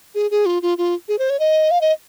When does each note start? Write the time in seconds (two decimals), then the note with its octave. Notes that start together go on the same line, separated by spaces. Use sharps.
0.15 G#4
0.31 G#4
0.46 F4
0.62 F4
0.78 F4
1.09 G#4
1.19 C5
1.30 C#5
1.40 D#5
1.71 F5
1.81 D#5